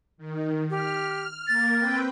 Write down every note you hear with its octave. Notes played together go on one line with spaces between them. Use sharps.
D#3
G4 F6
A#3 A#4 A6
C4 B4 G5